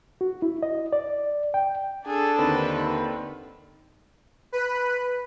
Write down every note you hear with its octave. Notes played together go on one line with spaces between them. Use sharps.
F#4
E4
D#5
D5
G5
D4 G#4 A4
D#2 D3 D#3 C4 B4
B4